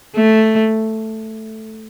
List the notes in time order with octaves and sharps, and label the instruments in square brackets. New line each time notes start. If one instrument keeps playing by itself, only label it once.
[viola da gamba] A3